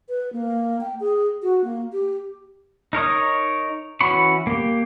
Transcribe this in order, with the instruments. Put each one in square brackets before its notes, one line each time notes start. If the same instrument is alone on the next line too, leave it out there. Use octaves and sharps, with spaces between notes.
[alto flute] B4
A#3
G5
G#4
F#4
A#3
G4
[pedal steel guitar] D#4 A#4 C#5 D#6
E3 C#4 F#4 B5 C#6
A#3 G4